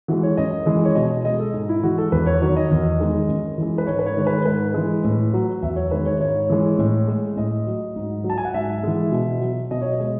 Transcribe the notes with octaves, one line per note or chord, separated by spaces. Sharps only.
E3 G#3 F#4
C#5
F#2 D#5
E3 G#3
C#5
B2 D#5
D#5
G#3 D#5
A4
G#2
E4
E3 G#3 F#4
A4
E2 B4
C#5
D#3 F#3 C#5
D#5
E2
D#3 G#3
F#2
E3 G#3
B4
G#2 C#5
B4
C#5
D#3 G#3
B4
G#2 B4
E3 G#3
A2
F#3
E2 E5
C#5
D#3 G#3 B4
C#5
G#2 C#5
E3 G#3
A2
G#3
A2 D#5
F#3
G#2
F#3
A5
G#5
F#5
G#2 E5
E3 G#3
B2
F#3
B2 D#5
C#5
D#5
G#3